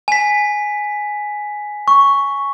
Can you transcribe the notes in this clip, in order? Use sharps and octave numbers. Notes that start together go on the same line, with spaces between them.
G#5 B6
C#6